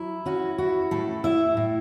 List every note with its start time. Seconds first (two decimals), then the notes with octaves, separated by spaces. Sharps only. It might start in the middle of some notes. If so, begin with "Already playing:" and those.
Already playing: F#3 E4
0.26 C#4 F#4
0.58 E4 F#4
0.91 A2 A4
1.24 E4 E5
1.57 A2